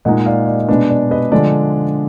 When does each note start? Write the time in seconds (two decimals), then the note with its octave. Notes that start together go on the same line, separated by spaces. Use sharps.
0.05 A#2 G#3 D#4 D#5 F#5
0.26 D5 F5
0.47 D5
0.69 B2 G#3 D4 B4
0.90 D5
1.11 B4 D#5
1.32 D3 F3 G#3 D4 D5